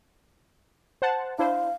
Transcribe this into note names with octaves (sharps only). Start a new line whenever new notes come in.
C5 F#5 A5
D4 E4 C5 F5